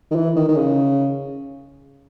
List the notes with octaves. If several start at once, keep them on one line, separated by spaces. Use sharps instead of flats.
D#3
E3
D#3
D#3
C#3